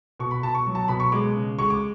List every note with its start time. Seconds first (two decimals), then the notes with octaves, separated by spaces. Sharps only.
0.20 B2 C#6
0.31 B5
0.43 B2 A5
0.55 C#6
0.67 F#3
0.75 A5
0.88 B2 B5
1.00 C#6
1.12 G#3 D6
1.36 C#3
1.58 G#3 C#6
1.70 D6